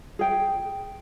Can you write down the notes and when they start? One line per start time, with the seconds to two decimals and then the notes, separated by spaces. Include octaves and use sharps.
0.19 G#4 G5